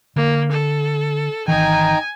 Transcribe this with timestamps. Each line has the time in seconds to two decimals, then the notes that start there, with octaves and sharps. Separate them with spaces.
0.16 D3 A#3
0.51 A4
1.48 G#1 D#3 E3 D#4 G5 G#5 A#5